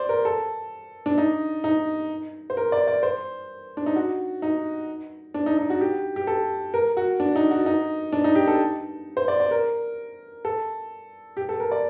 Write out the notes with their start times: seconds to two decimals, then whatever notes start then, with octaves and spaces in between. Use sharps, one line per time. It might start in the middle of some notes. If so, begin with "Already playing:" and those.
Already playing: C5 D5
0.09 A#4
0.25 A4
1.06 D4
1.18 D#4
1.64 D#4
2.50 C5
2.57 A#4
2.72 D5
2.87 D5
3.03 C5
3.77 D4
3.86 D#4
3.96 F#4
4.42 D#4
5.34 D4
5.46 D#4
5.58 D#4
5.70 F#4
5.81 G4
6.16 G4
6.27 A4
6.74 A#4
6.97 F#4
7.20 D4
7.36 D#4
7.51 F#4
7.66 D#4
8.13 D4
8.24 D#4
8.35 G4
8.47 A4
9.17 C5
9.28 D5
9.40 D5
9.51 A#4
10.45 A4
11.37 G4
11.49 A4
11.60 A#4
11.71 D5